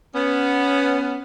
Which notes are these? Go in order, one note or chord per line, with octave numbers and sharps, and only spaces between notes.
B3 C#4